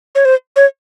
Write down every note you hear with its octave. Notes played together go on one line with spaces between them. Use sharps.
C#5
C5
C#5